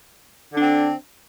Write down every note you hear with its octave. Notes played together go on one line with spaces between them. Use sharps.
D3 C4 D4